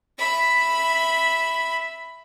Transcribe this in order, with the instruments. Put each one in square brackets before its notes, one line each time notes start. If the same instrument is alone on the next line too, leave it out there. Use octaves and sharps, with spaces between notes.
[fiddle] E5 B5